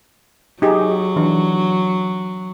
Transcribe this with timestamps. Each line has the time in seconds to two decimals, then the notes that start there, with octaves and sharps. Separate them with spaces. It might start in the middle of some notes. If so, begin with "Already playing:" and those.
0.62 F#3 D#4 G4 G#4
1.16 E3 D4